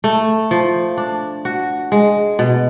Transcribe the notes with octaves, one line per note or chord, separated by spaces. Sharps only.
A3
F3
D4
F#4
G#3
B2